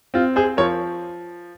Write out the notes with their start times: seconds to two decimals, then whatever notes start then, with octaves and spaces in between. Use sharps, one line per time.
0.14 C4 F4
0.36 G#4 C5
0.57 F3 A#4 C#5